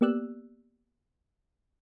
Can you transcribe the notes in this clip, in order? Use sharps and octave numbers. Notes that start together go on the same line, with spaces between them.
A#3 B3 G4 D5 E6 F#6